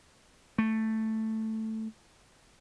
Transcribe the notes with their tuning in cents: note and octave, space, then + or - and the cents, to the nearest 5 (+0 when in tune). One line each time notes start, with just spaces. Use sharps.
A3 +5